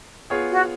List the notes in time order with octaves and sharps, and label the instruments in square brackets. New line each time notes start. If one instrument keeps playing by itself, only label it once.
[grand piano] B3 F4 G#4 C#5
[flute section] F#4